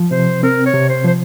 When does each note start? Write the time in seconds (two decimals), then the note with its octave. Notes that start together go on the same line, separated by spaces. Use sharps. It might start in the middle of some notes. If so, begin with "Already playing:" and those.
Already playing: F3
0.11 C3 C5
0.43 C4 A#4
0.66 C#5
0.74 C3
0.89 C5
1.05 F3 C5